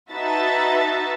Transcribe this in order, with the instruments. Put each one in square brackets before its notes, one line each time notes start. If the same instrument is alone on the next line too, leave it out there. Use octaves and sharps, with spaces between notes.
[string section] D#4 F#4 B4 E5 A5 A6